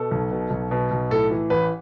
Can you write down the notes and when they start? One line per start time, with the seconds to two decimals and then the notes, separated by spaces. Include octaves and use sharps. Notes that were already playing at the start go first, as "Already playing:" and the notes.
Already playing: B2 A4
0.11 B1
0.31 B2
0.50 B1
0.71 B2
0.91 B1
1.10 A2 A4
1.31 E3
1.50 A1 B4